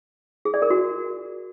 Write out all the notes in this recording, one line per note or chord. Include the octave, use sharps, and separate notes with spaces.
G#4
D5
A#4
F#4